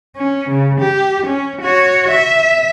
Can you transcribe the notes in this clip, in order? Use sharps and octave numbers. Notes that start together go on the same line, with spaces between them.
C#4
C#3
G4
C#4
F#4 C#5
E5